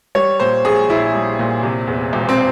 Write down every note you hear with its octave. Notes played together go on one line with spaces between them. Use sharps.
G3 C#5
A#2 C5
A#1 G#4
A#1 E4
G3
A#2
C3
E2
E1
C4